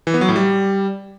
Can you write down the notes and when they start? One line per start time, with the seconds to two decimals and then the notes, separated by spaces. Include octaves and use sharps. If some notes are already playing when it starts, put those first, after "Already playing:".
0.07 E3
0.14 B3
0.21 F#3
0.28 A2
0.36 G3